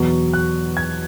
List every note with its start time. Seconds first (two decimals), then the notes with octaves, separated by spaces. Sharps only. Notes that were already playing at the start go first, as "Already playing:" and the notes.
Already playing: E2 B2 F#3 C#6
0.33 F#6
0.77 G#6